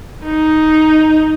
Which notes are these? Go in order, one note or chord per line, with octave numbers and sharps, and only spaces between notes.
D#4